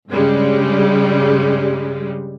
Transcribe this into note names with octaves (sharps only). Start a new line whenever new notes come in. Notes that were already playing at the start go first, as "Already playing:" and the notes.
G2 C#3 G3 G#3